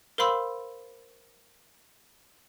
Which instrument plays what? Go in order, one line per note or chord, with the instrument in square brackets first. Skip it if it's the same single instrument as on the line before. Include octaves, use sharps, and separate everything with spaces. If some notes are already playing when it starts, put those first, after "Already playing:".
[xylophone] A#4 C5 F5 B5 C6 E6